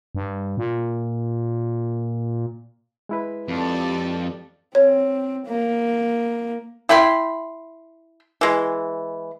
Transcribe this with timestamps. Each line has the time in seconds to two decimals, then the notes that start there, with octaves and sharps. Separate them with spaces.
0.15 G2
0.57 A#2
3.09 G#3 E4 B4
3.48 F2 G4 A4 D5
4.75 C4 C#5
5.47 A#3
6.89 E4 G5 B5 C6
8.41 E3 G#3